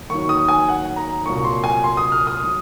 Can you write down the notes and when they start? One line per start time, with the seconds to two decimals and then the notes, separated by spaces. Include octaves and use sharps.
0.10 D#2 D#3 F#3 C#6
0.29 D#6
0.48 G#5
0.69 F#5
0.96 A#5
1.26 C2 A#2 F#3 C#6
1.44 C6
1.64 G#5
1.84 C6
1.97 D#6
2.12 F6
2.27 D#6
2.44 F#3